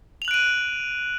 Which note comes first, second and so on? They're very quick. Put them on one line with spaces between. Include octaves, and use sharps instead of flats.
F7 F#7 F#6 D7 D#7